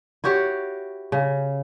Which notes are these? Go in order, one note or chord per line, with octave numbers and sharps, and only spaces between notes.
E4 F#4 G4 C#5
C#3